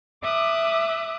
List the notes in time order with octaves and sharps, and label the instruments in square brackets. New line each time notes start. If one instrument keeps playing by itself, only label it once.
[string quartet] E5 D6 D#6 F#6